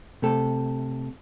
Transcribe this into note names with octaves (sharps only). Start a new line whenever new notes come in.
C3 A3 A4